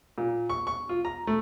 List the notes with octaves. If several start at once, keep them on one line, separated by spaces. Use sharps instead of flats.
A#2
C#6
C#6
F4
A#5
A3